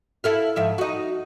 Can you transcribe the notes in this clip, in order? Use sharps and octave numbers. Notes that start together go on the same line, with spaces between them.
E4 A4 F5
G#2 F3 E5
D#4 F#4